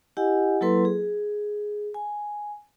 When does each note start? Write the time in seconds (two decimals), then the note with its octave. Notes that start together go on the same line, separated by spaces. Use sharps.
0.17 E4 G4 D#5 F#5 G#5
0.61 F#3 A#3 E4 A4 B4 C6
0.85 G#4
1.95 G#5